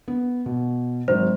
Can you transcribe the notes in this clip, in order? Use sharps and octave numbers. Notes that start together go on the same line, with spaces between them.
B3
B2
G#1 F#3 C5